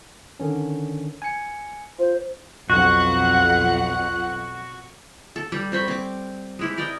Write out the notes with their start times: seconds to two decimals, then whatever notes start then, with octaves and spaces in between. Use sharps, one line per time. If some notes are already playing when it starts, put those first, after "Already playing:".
0.40 D3 D#3 C#4
1.22 G#5 C#7
1.99 F4 C5
2.70 B1 F2 F#4 F#5
5.36 A4
5.52 G3
5.72 C4 C5 B5 C#6
5.88 C4 D6
6.59 G#3 E4 G4
6.77 A#4 D5 D#5 G5